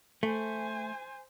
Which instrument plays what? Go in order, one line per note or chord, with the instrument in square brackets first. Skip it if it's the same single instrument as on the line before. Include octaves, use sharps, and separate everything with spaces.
[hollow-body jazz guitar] A3 [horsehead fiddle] C5 G#5